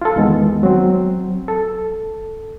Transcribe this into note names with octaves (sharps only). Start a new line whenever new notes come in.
F4 A4
E2 D#3 G#3 B3
F#3 C4
A4